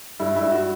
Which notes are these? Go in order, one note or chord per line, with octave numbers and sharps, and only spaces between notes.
G2 E4
G2 E4
F#4